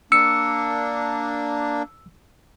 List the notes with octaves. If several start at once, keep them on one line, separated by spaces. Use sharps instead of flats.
A#3 D4 E6 C#7